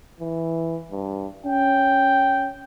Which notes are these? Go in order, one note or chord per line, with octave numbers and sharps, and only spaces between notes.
E3
G2
C#4 G5